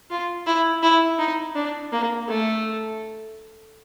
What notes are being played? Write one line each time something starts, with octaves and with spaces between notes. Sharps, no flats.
F4
E4
E4
D#4
D4
A#3
A3